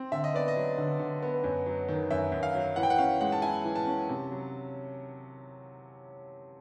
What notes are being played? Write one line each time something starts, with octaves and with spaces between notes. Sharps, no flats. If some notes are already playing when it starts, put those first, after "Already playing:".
Already playing: C4
D3 E5
D#5
B3 D5
D#5
F#3
D3
D3
B3
F#2
F#3
D#3
F#2 E5
F#2
F5
F#3
E3 F#5
G5
F#5
C#4 F5
G#3 F#5
A5
E4 G#5
E3
A5
C#4
C3
F#3